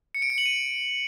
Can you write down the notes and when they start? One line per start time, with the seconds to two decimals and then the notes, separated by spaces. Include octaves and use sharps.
0.15 C#7
0.22 D7
0.30 C#7
0.38 F#7
0.46 D#7